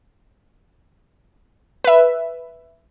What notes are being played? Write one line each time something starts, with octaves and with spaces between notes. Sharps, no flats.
B4 E5